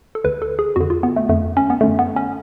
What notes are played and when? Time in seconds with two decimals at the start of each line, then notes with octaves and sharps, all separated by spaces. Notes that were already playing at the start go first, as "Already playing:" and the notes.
0.15 A4
0.24 D2 D3 B4
0.42 A4
0.59 G#4
0.76 F2 D3 F#4
0.90 F4
1.03 B3
1.16 A3
1.29 F2 D3 A3
1.57 C#4
1.70 B3
1.81 F#2 D3 A3
1.99 B3
2.16 C#4